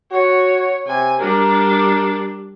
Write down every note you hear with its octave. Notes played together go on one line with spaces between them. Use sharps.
F#4 C#5
C3 G#5
G3 D4 A#4